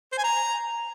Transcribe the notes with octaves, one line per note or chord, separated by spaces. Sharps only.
C5
G#5
A#5